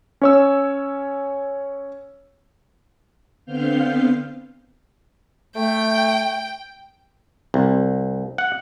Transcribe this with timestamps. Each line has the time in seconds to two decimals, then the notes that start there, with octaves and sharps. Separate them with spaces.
0.22 C#4 C#5 E6
3.45 D3 B3 C4 F5 F6 G6
5.56 A3 G5
7.54 C2
8.38 F#5